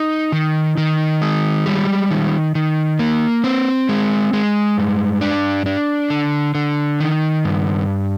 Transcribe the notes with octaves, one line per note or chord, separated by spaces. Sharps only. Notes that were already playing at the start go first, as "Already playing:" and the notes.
Already playing: D#4
D#3
D#3
G#3
G3
D#3
D#3
A#3
C4
G#3
G#3
G2
D4
D4
D3
D3
D#3
G2